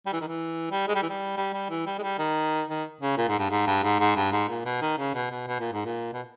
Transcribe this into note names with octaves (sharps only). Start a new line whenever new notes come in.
G3
E3
D#3
E3
G3
G#3
G3
E3
G3
G3
G3
E3
G3
G#3
G3
D#3
D#3
C#3
A#2
G#2
G2
G#2
G2
G#2
G#2
G2
G#2
A#2
B2
D#3
C#3
B2
B2
B2
A#2
G#2
A#2
B2